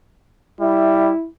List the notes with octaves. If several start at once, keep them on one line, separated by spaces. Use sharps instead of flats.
G3 E4 E5